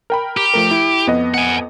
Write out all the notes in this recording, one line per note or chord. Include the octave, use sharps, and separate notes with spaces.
A#4 G5 B5
G4
F3 A3 A#4
E4
F2 B3 D#5
F#5 G#5